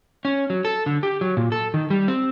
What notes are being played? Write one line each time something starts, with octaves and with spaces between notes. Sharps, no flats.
C#4
F#3
A4
D3
G4
F#3
A#2
A4
D#3
G3
C4